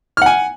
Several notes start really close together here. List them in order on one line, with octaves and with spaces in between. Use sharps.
F6 F#5 G#5